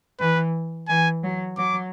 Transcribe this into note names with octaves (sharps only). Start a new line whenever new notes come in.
E3 B4
E3 G#5
F#3
F#3 D6